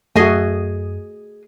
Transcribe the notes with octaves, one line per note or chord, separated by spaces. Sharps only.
F#2 A3 F#4 G#4 D#5 G#5